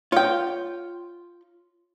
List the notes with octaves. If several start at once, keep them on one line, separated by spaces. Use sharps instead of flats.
F4 C#5 G5